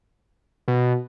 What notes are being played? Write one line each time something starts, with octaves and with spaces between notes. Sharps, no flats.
B2